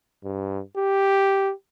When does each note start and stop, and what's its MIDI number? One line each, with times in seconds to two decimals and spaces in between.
0.24 0.61 43
0.77 1.52 67